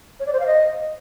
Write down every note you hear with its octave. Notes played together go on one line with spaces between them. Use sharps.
C#5
D5
C5
F5
D#5